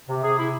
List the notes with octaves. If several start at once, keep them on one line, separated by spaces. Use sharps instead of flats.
C3
C3 G#4
C3 E4